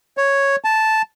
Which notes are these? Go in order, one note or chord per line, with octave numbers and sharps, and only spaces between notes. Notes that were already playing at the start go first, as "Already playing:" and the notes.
C#5
A5